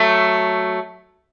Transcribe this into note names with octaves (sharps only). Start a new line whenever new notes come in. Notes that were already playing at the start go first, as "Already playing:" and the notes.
Already playing: F#3 A3